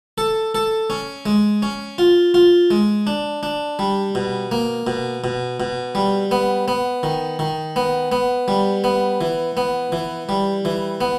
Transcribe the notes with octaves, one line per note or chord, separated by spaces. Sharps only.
A4
A4
C#4
G#3
C#4
F4
F4
G#3
D4
D4
G3
B2
A#3
B2
B2
B2
G3
B3
B3
D#3
D#3
B3
B3
G3
B3
E3
B3
E3
G3
E3
B3